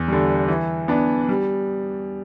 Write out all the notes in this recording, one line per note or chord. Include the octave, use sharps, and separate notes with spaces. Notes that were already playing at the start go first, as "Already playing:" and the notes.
Already playing: E2
D3 G3
E3
B3 D4
G3